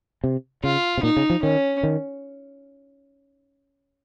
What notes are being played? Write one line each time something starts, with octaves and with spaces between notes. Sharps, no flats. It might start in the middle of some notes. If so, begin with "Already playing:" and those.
C3
C#3 F4
C3
A#2 D#4
C#3
F3
D#3 C#4
D#3